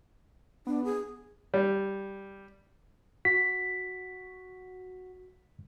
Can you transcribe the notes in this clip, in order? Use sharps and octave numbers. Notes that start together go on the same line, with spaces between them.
B3 D4
G#4
G3
F#4 B6